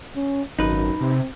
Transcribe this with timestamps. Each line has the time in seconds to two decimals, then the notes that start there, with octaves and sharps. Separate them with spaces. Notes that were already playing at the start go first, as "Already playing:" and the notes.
0.16 C#4
0.59 G#1 F#2 D#4 B4
1.01 C3 C4